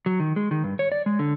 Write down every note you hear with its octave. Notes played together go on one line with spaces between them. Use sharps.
F#3
D#3
G#3
D#3
G2
C#5
D5
G#3
D3